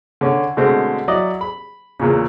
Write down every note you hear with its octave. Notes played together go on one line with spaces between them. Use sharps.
D3 C#4
B2 D3 G#3 A3 C4
F#3 E4 D5 D#5
B5
E2 A#2 C#3